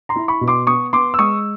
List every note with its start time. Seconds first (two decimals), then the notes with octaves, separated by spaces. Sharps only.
0.09 A#5 C6
0.16 E4
0.28 B5 C#6
0.41 B2
0.48 C6 D6
0.67 B3 C#6 D#6
0.93 B3 C6 D6
1.14 E6
1.19 G#3 C#6 D#6